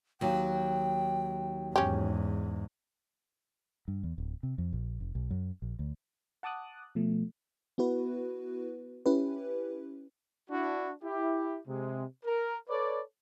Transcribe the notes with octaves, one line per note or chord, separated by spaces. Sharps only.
D#2 F#3 G5
E2 G#2 C#4 G4
G2
E2
D1
C3
F2
A#1
F1
B1
F#2
A#1
D2
F#5 A5 D6 D#6 F#6
B2 F3 A3
B3 E4 F#4 B4
C#4 E4 G4 B4
D4 E4 F#4
E4 G4
C3 G#3
A#4
A4 B4 C#5 D5